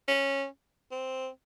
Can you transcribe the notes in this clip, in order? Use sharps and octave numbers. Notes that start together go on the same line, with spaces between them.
C#4
C4